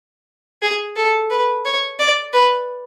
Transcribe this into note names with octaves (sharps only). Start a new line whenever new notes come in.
G#4
A4
B4
C#5
D5
B4